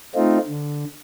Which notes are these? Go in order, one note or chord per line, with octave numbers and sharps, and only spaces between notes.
A3 C4 D#4 F4
D3